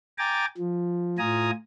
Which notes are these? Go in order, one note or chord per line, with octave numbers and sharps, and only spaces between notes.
G5 G#5 A#5 D6 A6
F3
A2 F4 G#5 A#5 D#6